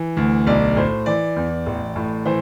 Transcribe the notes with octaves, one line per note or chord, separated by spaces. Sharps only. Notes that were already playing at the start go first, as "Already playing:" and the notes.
Already playing: E3
D2
B1 D5
A2 C5
E3 D5
E2
A1
A2
E3 C5